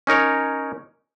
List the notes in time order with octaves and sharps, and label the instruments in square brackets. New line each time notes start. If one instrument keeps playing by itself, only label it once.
[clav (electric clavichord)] C#4 D#4 A#4 C#5